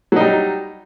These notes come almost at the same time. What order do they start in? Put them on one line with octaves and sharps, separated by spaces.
F#3 D#4 G3